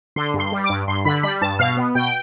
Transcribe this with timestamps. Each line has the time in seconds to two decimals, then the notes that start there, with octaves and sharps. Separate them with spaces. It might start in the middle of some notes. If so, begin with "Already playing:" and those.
0.16 D3 C6
0.34 G2
0.40 C6
0.52 G3
0.64 D6
0.70 G2
0.88 G2 C6
1.05 D3 B5
1.23 G3 B5
1.41 G2 A5
1.59 B2 F5
1.77 B3
1.95 B2 G5